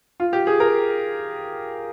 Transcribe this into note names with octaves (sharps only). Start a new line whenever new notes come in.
F4
G4
G#4
A#4